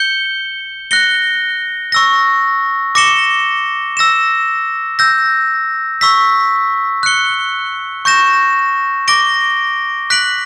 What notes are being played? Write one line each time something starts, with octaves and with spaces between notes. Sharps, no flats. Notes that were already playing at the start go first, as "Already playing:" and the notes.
Already playing: G6 C#7 G7
F#6 A#6 C#7 G7
C#6 E6 A#6
D6 A#6 C#7 E7 G7
E6 A#6 E7
E6 G6 A#6
C#6 E6 B6
F#6 C#7 G7
C#6 G6 A#6 E7
D6 A#6 D7 G7
F#6 B6 D7 F#7